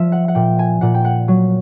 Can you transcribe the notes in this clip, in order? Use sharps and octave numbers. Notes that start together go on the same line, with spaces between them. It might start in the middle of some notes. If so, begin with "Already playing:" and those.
Already playing: F3 E5
F#5
F#5
A#2 G5
G#5
A#2 F#5
G5
F#5
F#3